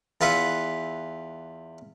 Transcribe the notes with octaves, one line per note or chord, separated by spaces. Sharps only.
E2 F4 B4 E5 F#5